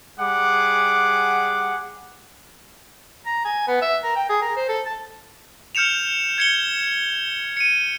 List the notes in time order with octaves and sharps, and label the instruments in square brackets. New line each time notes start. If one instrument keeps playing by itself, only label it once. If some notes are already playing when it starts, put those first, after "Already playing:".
[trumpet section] G3 G#4 F#5 D6
[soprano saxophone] A#5
G#5
B3
E5
A#4
G5
G#4
A#4
C5
A4
A5
[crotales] F6 G6 C#7 E7 F7
G#6 C#7 G7
C#7 D#7